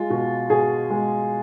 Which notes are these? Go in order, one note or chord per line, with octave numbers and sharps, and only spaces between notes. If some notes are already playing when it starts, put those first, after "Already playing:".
Already playing: G#3 F4
B2
B2 G#4
G#3